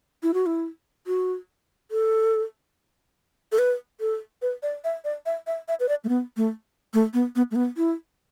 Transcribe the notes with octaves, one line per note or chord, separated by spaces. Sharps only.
E4
F#4
E4
F#4
A4
A4
B4
A4
B4
D5
E5
D5
E5
E5
E5
B4
D5
A3
B3
A3
A3
B3
B3
A3
B3
E4